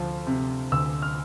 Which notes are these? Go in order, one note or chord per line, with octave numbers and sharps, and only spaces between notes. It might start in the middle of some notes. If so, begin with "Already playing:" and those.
Already playing: D2 F3
C3
D2 E6
F6